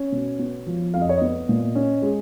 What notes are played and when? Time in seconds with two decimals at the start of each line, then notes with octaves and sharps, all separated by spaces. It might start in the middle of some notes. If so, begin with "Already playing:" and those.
Already playing: C#4 C#5
0.12 B2
0.39 B3
0.67 F3
0.94 F2 F5
1.02 D#5
1.09 C#5
1.17 B3 D#5
1.49 A#2
1.75 C#4
2.02 G#3